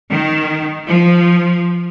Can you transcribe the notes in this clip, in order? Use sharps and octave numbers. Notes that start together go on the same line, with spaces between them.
D#3
F3